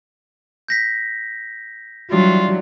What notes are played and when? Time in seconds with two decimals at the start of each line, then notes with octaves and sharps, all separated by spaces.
0.68 G6 A#6 B6
2.12 E3 F#3 G3 D4 F4